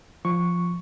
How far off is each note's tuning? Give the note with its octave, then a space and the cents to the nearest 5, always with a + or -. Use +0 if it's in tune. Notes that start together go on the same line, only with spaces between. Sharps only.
F3 +0 C#6 +0